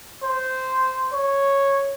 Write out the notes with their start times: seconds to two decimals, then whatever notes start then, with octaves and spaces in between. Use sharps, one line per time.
0.23 C5
1.13 C#5